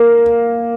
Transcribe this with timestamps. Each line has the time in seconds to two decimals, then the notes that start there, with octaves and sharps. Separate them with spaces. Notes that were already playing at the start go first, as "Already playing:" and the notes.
Already playing: A#3